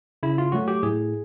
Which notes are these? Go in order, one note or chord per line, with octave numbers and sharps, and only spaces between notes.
C#3 E4
F4
F#3 A3 F#4
G4
A2 G#4